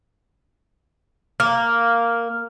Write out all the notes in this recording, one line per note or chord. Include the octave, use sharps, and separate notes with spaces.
A#3 F6